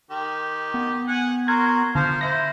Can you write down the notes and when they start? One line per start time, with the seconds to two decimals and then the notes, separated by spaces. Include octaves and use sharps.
0.11 D#3 G4
0.74 B3
1.08 F#5 G#5
1.48 F#4 A#4 C6 G#6
1.95 D3 F3 C5 F5
2.21 E4 C5 A#6